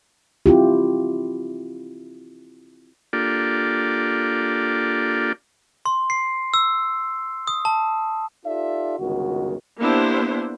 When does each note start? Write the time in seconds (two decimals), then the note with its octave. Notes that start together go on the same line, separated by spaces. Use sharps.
0.46 C4 E4 F4 G4
3.13 A#3 D4 F4 G4 A4 D5
5.86 C6
6.10 C7
6.54 E6
7.47 D#6
7.65 A5
8.45 D#4 F4 G4 A4 D5 E5
8.99 G1 C#2 D#3 F#4
9.80 A#3 B3 D4 E4 G4 C5